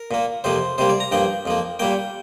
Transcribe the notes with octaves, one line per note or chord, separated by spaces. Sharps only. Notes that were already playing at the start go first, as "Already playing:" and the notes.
Already playing: A#4
A#2 A#3
F2 C3 F3 A#3 C5
C3 G3 A#3 C5
D5
A#5
G2 F3 A#3 G5
F2 F3 A#3
A#2 G3 A#3 G5